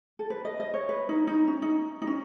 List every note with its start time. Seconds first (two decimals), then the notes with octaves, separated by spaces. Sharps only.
0.19 A4
0.30 B4
0.45 D#5
0.60 D#5
0.74 C#5
0.89 B4
1.09 D#4
1.27 D#4
1.48 C#4
1.62 D#4
2.02 D#4
2.07 C#4